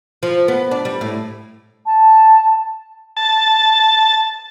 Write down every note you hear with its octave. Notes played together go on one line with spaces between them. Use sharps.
F3
B3
D4
G3
A2
A5
A5